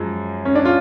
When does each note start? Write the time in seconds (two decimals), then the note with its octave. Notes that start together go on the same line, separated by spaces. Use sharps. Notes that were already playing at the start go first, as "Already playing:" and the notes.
Already playing: F#2 F3 G#3
0.45 C#4
0.55 D4
0.65 F4